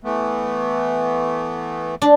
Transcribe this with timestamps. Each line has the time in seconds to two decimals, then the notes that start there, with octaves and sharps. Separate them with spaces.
0.04 E3 A3 B3
2.02 D4